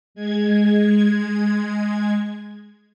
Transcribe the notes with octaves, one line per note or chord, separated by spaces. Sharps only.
G#3 G#6